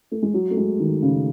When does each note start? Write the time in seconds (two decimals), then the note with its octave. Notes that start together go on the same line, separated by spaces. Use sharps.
0.11 A3
0.22 G#3
0.34 F#3
0.51 A3
0.57 G#3
0.80 D#3
1.02 C#3